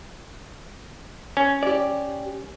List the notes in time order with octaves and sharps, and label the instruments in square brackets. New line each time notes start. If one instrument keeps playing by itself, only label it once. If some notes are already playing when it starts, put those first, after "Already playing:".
[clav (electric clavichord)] C#4
[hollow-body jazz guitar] G4 D5